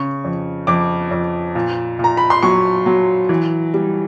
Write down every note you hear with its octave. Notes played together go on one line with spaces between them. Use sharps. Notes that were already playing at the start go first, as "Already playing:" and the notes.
Already playing: C#3 C#6
F2
F2 D6
F2
A#2
A#2
A#5
B5
C6
F#3 C#6
F#3
E3
G3